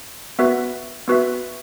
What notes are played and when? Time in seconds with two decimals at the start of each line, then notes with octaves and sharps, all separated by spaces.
0.39 B3 F#4 B4 E5
1.08 B3 F#4 B4 E5